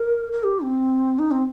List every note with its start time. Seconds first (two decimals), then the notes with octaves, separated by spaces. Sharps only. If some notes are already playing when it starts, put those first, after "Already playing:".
Already playing: A#4
0.32 A#4
0.44 G4
0.63 C4
1.19 D#4
1.31 C4